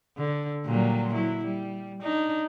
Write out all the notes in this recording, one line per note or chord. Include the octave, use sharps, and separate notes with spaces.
D3
A#2 F#3 G3
F#3 E4
G3
D4 D#4